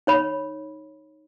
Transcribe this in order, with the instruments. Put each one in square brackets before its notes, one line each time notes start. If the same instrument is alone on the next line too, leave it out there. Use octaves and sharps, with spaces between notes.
[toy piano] D#4 C#5 B5